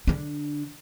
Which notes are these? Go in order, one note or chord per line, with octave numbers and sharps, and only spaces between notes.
D3 D4